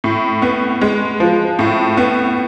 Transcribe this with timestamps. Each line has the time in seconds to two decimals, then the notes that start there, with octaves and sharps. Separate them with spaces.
0.04 A2
0.42 B3
0.81 G#3
1.20 F3
1.59 A2
1.97 B3